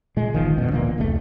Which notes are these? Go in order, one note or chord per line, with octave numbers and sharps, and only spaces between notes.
A#2 G#3
G1 D#3 F3
A1 E2 B2 D3
D1 A#2 E3 A#3
F1 C#2 A#2 A3